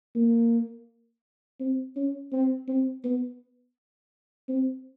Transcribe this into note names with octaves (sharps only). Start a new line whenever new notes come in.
A#3
C4
C#4
C4
C4
B3
C4